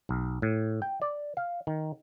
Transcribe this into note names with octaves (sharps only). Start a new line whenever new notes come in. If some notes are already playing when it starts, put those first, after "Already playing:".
B1
A2
G5
D5
F5
D#3